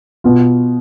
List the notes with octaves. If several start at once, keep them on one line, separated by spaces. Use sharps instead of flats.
B2 B3 F4